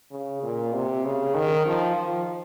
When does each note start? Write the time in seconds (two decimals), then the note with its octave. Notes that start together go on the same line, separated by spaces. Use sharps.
0.12 C#3
0.43 A#2
0.74 C3
1.05 C#3
1.35 D#3
1.66 F3
1.96 F3